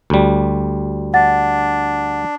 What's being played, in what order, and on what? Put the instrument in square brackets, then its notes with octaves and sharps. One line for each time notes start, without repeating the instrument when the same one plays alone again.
[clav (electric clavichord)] D2 G3
[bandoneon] D4 [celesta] F#5 A6